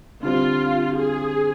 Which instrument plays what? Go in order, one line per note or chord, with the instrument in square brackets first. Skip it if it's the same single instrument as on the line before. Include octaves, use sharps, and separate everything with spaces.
[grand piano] D3 G3 C4 [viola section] F4
[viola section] G#4